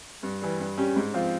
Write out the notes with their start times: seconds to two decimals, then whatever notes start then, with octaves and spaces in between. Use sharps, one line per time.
0.23 G2
0.42 E3 G3
0.60 G2
0.77 G3 C#4 G4
0.96 G#2
1.14 F3 C4 F4